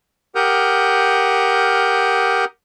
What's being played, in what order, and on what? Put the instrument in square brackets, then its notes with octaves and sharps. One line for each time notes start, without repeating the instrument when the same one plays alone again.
[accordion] G4 A#4 F#5 D#6 F6 G6